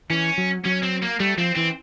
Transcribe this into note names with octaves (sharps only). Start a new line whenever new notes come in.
E3 C#4
F#3
F#3 C#4
C4
A#3
G3 A3
F3 C4
E3 C4